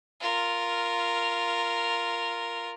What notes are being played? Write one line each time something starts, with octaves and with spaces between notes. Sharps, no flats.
F4 A#4